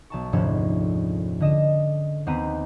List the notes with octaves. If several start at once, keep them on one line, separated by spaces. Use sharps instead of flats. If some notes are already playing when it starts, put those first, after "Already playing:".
B1 A5 C#6
F1 D2 G#2 F3 C#4 E6
D3 D#5 E7
D#2 B3 C4 B4 A#5 D#7